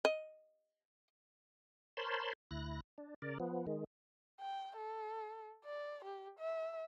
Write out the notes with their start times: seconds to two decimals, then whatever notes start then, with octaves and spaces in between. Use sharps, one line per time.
0.05 D#5
1.97 A#4 C5 C#5 A5 B5 C6
2.51 D2 E4 F#6 A#6
2.98 D4
3.22 C#3 A#4 D5
3.40 F3 B3
3.67 D#3 G#3
4.40 G5
4.77 A4
5.65 D5
6.05 G4
6.40 E5